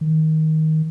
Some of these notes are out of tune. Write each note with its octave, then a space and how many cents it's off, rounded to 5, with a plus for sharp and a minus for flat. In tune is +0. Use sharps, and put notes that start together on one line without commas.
D#3 +15